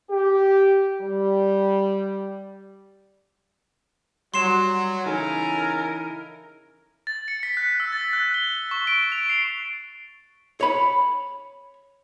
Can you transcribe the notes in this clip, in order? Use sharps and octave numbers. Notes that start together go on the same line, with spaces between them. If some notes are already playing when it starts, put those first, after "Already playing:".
G4
G3
F#3 G3 C6 C7 E7
C#3 E3 D#4 E4 A4 A#4 G#5
A6
C#7
B6
F#6
E6
A6
F#6
G7
C#6
D7
F7
C7
C#5 B5